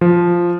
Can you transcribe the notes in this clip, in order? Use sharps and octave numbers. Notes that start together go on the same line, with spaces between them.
F3